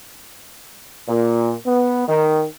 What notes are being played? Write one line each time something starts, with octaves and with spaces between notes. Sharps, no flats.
A#2
B3
D#3